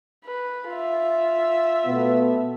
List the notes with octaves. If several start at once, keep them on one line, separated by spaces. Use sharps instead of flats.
B4
F4 E5
B2 A3 B3